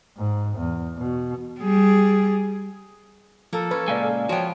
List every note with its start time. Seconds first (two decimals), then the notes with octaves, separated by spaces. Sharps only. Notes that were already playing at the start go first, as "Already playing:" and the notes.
0.17 G#2
0.57 E2
0.98 B2
1.60 G3 G#4
3.53 F3 A#3 A4
3.71 C#4 B4
3.88 A#2 C#3 G#3 D5 F5 G#5
4.29 F3 B3 F#4 C#5 G5